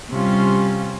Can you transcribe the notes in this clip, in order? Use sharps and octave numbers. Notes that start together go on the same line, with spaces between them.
C3 G3 C#4 F4